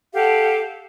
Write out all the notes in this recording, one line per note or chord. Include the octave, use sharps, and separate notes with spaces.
G4 A4 F5 F#5